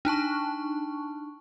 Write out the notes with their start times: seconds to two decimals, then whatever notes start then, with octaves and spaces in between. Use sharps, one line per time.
0.05 D4 D#4 A5 C#6